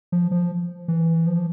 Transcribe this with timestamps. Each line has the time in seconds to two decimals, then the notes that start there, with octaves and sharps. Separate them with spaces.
0.12 F3
0.31 F3
0.88 E3
1.26 F3